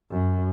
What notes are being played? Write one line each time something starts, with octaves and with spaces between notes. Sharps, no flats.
F#2